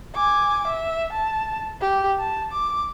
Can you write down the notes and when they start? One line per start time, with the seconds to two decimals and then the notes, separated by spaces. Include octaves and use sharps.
0.15 G#5 D6
0.67 E5
1.12 A5
1.81 G4
2.19 A5
2.52 D6